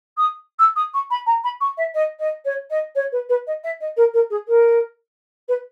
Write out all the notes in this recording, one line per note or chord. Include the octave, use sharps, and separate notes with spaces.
D#6
E6
D#6
C#6
B5
A#5
B5
C#6
E5
D#5
D#5
C#5
D#5
C#5
B4
B4
D#5
E5
D#5
A#4
A#4
G#4
A#4
B4